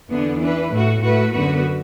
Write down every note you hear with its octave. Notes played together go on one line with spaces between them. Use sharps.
E2 D3 B3 D4
E3 D4 B4
A2 A3 F#4
A2 A3 F#4 B4
F#2 D3 B3 F#4 B4